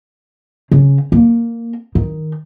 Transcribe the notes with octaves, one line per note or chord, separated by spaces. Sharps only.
C#3
A#3
D#3